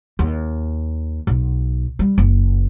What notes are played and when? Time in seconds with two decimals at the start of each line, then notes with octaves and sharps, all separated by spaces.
0.19 D#2
1.27 B1
1.99 G3
2.18 F#1